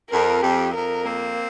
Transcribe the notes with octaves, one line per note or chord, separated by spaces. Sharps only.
F2 A#4
F2 G4
F2 A#4
A#3 C4